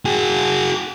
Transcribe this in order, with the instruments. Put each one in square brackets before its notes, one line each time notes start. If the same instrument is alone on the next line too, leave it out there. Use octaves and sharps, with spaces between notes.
[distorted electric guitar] F#4 G#4